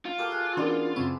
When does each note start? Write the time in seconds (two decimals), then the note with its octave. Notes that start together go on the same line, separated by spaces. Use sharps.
0.05 F4
0.18 A3 A#3 F#4 G4 E6
0.32 G#4 F#6
0.57 E3 G#3 B3 C#4 D4 F#4 A#4 D5
0.96 F#2 C#3 C4 E4 C#6